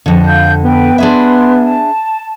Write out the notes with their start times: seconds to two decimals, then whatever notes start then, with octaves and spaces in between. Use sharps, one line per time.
0.06 F2 D3
0.26 F5 G6
0.64 B3 B4 G5
0.98 D4 G#4 E5 B5 C6
1.61 A5